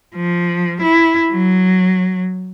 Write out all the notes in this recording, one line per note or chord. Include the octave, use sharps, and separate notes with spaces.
F3
E4
F#3